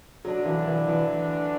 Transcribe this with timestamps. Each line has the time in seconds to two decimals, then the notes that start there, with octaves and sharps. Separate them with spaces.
0.25 D3 F#3 A3 D4
0.46 E3
0.67 E3
0.88 E3